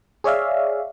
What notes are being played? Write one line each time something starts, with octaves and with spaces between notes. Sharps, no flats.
G#4 C#5 D5 E5 F5